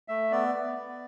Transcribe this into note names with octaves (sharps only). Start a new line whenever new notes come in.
A3 E5
B3 D5
B3
B3